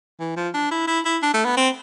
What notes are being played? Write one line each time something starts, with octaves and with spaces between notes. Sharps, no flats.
E3
F3
D4
E4
E4
E4
D4
A3
B3
C4